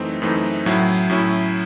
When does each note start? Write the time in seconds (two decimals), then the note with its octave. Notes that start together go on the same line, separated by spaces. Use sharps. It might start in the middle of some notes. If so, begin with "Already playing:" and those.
Already playing: F#2 E3 A3 C4 D#4
0.22 F#2 E3 A3 C4 D#4
0.66 A2 F#3 C#4 E4
1.10 A2 F#3 C#4 E4